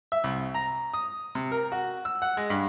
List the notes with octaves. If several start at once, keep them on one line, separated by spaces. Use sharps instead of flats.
E5
C2
A#5
D#6
C3
A#4
F#4
E6
F#5
G#3
G2